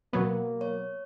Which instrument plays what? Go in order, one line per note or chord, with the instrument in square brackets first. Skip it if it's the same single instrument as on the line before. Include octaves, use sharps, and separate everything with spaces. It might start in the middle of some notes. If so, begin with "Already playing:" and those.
[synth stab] B2 F#3 B3 [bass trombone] A#3
[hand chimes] C#5